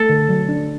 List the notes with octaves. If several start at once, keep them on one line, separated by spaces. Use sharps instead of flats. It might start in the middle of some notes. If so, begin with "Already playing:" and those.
Already playing: A3 A4
D3
F#3
D4